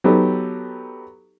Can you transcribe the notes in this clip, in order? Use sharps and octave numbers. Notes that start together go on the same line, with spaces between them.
F#3 B3 D#4 G4 A4